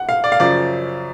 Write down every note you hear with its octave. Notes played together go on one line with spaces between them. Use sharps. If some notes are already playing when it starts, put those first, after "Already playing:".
Already playing: F#5
F5
D5
F5
F#2 C#3 F3 D5